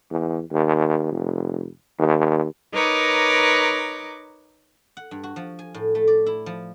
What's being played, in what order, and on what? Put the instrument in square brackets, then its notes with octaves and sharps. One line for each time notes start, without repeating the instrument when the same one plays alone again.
[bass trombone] E2
D#2
F1
D#2
[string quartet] D#4 A#4 B4 C#5 D6
[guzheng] F#5
G2
F#4
F3
G#5
A2
A3
D5
E4
F3